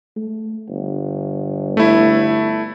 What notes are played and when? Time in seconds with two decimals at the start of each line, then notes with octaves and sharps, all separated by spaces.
0.17 A3
0.68 G1
1.77 A3 E4